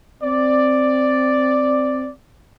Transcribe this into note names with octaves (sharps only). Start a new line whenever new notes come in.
C4 D5